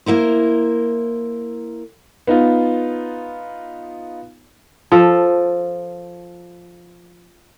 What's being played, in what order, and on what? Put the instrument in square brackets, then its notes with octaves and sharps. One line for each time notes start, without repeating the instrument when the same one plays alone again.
[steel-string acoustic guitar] A#3 E4 A#4 C5
[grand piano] B3 D#4 F4
[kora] F3 A4